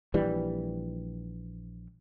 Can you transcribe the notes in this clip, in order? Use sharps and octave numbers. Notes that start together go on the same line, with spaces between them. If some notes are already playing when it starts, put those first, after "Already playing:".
A#1 E3 G3